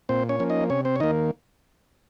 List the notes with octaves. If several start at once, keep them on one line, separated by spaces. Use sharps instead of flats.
A#2 C4 C5
C#4 C#5
F3 A#3 C#4
D#4 D#5
C3 C#4 C#5
C4 C5
C#5
D#3 A#3 D#4 D#5